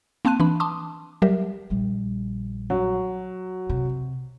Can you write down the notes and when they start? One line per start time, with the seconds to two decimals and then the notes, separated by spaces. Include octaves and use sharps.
0.25 A#3 C4 A5 C6 F#6 D#7
0.40 E3 D4 B5
0.60 A5 C6 D6 D#6
1.22 F#3 G3 G4 A#4 E5
1.70 A#1 G3
2.70 F#3
3.69 C3